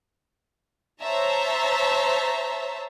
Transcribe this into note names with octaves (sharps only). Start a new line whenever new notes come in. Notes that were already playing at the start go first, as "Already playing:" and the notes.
C5 C#5 E5 A5 A#5